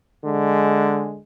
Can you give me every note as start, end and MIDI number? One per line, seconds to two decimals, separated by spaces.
0.24 1.19 50
0.24 1.19 56